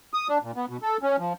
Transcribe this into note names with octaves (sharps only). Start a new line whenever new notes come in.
D#6
D4
A#2
B3
B2
A4
C#4
F3